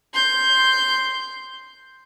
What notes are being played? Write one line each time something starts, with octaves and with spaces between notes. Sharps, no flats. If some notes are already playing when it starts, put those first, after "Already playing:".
C6 G6